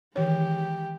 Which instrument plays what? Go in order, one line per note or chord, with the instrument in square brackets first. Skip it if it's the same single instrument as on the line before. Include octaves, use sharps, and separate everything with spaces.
[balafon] D#3 E3 C#5 [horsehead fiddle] G#3 G4